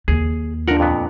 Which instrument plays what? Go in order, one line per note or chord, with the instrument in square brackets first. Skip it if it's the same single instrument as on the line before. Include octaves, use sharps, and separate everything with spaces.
[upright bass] D#2 [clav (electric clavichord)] G#4
[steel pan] D4 F4 [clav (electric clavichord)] A#4 F#5
[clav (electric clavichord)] F2 A#2 B3